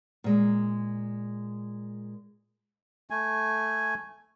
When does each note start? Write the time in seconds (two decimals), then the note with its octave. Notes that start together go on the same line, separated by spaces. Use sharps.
0.24 A#2 G#3 A#3
3.10 A3 G#5